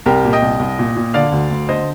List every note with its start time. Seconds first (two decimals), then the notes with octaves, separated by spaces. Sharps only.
0.06 C2 G4 A#4
0.24 A#2
0.33 D#5 G5
0.42 C2
0.60 C2
0.79 A#2
0.96 A#2
1.14 D3 D5 F5
1.32 D2
1.51 D2
1.69 D3 C5 D#5